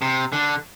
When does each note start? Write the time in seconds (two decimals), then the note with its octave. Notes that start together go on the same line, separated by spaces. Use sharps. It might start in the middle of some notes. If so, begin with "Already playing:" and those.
0.02 C3
0.33 D3